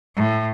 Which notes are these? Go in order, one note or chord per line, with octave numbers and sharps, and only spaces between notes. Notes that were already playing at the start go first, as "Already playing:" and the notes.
A2